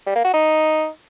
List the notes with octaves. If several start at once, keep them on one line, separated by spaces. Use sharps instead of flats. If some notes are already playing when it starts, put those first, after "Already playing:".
G3
A#3
F#4
D#4